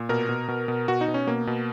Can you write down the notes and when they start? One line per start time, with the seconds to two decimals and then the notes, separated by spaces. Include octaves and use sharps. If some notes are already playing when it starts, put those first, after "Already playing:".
Already playing: A#2
0.09 B2 A#4
0.29 B2
0.48 B2
0.68 B2
0.88 B2 F#4
1.01 D#4
1.08 B2
1.14 C#4
1.27 B2 A#3
1.47 B2